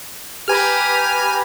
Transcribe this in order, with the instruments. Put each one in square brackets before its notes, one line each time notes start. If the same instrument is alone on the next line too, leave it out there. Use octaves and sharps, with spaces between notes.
[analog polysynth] G4 B4 A#5 [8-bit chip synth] G#5 F6